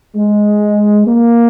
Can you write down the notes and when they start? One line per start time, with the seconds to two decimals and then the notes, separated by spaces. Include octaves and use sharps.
0.16 G#3
1.06 A#3